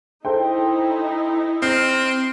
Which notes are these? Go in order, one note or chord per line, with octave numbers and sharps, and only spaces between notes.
D#4 E4 A4 C5 G5
C4 F6 A#6